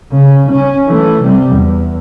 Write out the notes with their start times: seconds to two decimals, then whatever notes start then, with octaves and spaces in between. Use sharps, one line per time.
0.12 C#3
0.51 C#4
0.87 E3 A3
1.23 C3 G3
1.52 E2